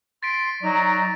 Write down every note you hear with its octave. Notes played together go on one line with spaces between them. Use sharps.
C6 A6 B6 D7
F#3 D#4 D5 A#5